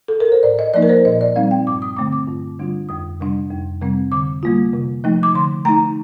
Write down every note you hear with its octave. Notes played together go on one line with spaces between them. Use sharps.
A4
A#4
C5
A2 D5
D#5
F3 A#3 D#4 D5
A#4
C5
A#2 D#5
D5
G3 C4 D#4 F5
G5
G2 D6
D#6
D3 A3 C4 D6
D6
G2
D3 G3 D4 F4
F2 D#6
C3 G3 D4
F2
C3 G3 C4
D3 D6
G3 A#3 F4
C3
F3 A3 D#4
D6
D3 C6
A3 D#4 A#5